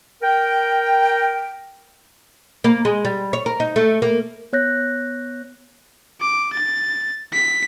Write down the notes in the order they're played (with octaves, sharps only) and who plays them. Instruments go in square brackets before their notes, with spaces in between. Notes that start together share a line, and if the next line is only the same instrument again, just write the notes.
[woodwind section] A#4 G5
[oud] A#3
G#3
G3
C#5
A#4
D#4
A3
A#3
[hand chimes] B3 C#5 F#6 G6 A#6
[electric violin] D6
A6
B6